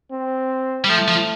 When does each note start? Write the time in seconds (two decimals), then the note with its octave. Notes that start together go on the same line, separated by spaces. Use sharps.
0.11 C4
0.84 G3
0.89 F3 A3
1.08 F3